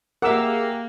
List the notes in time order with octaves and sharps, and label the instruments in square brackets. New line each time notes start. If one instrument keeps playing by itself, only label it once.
[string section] A#3 [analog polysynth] G4 G#4 [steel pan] A#4 D6 E6 [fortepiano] E5 F#5